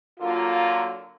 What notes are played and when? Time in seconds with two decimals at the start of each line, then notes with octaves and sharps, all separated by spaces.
0.20 D3 F#3 A#3 F4